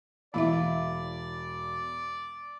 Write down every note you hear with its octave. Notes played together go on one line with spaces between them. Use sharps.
E1 E3 E4 D5 E5 F5 B5